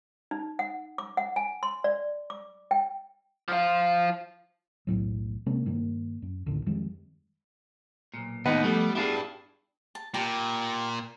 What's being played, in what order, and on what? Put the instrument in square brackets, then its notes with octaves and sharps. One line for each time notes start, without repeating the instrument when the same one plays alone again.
[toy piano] D#4
F#5
D6
F#5
G#5
C6
D5
D6
G5
[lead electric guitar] F3 F4
[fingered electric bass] B1 E2 A2 F#3
C3 G#3 A#3 C#4
G2 D#3 A#3
F#2
A1 D#2 D3 D#3
F2 D#3 G3 G#3
[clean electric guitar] B1 A#2
[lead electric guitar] D#2 [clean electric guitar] A2 D#4 D#5 [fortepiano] B3
[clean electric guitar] F3 A3 [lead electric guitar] G3
[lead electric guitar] D4 G4 [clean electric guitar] E4 F4 G#4
[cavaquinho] A5
[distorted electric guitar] A#2 [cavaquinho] G4 A5 B5